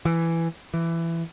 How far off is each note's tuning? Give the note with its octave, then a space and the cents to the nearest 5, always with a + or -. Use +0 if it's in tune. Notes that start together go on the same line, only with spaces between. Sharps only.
E3 +10
E3 +15